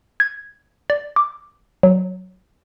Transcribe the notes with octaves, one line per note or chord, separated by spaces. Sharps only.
G#6
D5
D6
F#3